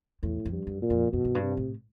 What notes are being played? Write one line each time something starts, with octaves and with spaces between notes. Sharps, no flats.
E2 A2
F2
G2
F#2
A#2
F2
F#2 B2
F#2
G2
C3
A2